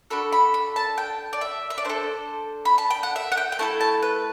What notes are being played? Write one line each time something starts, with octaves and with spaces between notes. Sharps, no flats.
D4 F#4 A4 B5
B5
B5
A5
G5
D5
E5
E5
D5
D4 A4 C5
B5
A5
G5
F#5
E5
F#5
G5
G5
A3 E4 A4 A5
A5
B4